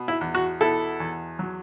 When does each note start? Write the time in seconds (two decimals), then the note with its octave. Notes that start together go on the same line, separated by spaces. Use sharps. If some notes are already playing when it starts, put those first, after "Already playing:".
Already playing: B2
0.08 E4
0.21 E2
0.35 F#4
0.61 B2 E4 A4
1.00 E2
1.39 F#3